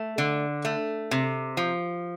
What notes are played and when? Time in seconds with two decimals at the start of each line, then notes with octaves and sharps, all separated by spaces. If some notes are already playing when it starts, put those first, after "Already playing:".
Already playing: A3
0.18 D3
0.65 A3
1.11 C3
1.57 F3